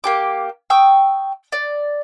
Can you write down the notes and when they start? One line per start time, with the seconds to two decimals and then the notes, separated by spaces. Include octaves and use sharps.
0.04 A#3 G4 D6
0.70 G5 C#6 D#6 E6
1.52 D5